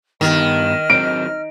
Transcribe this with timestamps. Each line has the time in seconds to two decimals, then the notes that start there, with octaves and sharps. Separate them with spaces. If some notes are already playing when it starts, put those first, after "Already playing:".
0.21 G2 D#3 B3 G4 D#5 F6
0.90 F#3 C4 D7